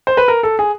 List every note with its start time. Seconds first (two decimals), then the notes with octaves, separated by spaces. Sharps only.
0.07 C5
0.17 B4
0.28 A#4
0.43 A4
0.59 G#4